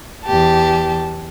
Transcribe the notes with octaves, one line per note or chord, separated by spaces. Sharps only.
E2 G4 A5